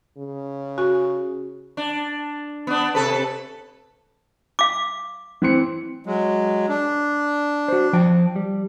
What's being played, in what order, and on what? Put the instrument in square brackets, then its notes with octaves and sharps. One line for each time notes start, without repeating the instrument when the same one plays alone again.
[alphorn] C#3
[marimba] F#4 G#5 C#6
[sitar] D4
B3 D4
C3 A4 B4
[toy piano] F5 D6
[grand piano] E3 C4 C#7
[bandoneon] F#3 G#3
D4
[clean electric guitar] F#4 C5
F3 G5 A5
G3